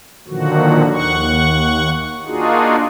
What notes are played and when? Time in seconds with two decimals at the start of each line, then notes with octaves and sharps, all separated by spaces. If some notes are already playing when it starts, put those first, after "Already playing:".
0.28 A#2 D3 D#3 F3 F#3 F#4
0.92 D#2 F#5 C#6
2.26 A#3 D4 D#4 F4 F#4 G#4